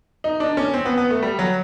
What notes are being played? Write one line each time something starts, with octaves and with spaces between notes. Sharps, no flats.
D#4
D4
C#4
C4
B3
B3
A3
G3
F#3